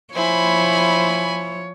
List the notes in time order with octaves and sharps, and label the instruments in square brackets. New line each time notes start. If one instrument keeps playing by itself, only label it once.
[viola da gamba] F3 C#5 [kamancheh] E4 C5 [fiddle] G#5 B5